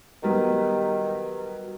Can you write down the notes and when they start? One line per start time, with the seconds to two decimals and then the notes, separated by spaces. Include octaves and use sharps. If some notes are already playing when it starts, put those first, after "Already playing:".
0.23 D#3 F#3 G3 B3